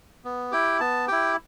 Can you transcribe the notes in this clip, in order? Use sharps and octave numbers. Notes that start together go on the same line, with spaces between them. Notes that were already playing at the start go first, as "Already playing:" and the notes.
B3
E4 G4 G5
B3 A5
E4 G4 G5